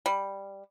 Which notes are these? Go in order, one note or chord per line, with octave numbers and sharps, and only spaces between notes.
G3